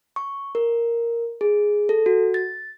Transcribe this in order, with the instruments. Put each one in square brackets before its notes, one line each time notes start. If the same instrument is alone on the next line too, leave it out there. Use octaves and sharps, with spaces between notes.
[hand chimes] C#6
A#4
G#4
A4
F#4
A6